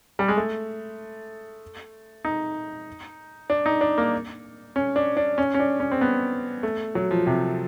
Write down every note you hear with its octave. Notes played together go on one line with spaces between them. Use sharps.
G3
G#3
A3
D#4
D4
D#4
D4
A#3
C#4
D4
D4
C#4
C#4
D4
C#4
C4
B3
A3
F#3
F3
C3